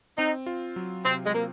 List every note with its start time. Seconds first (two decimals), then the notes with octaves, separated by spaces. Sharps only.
0.17 C4 D#4
0.46 F4
0.76 F#3
1.05 C3 C4
1.26 G#3
1.34 A#3 C4